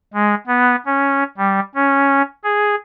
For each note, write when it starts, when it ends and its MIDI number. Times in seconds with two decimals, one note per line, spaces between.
0.14 0.35 56
0.47 0.76 59
0.86 1.23 61
1.38 1.60 55
1.75 2.22 61
2.44 2.75 68